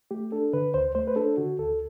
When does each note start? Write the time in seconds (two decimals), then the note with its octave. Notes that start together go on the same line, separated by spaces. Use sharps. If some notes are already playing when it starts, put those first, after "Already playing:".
0.11 A3 G4
0.32 D4 A4
0.53 D3 B4
0.74 D2 C5
0.95 A3 C5
1.07 B4
1.16 D4 A4
1.37 D3 F#4
1.59 D2 A4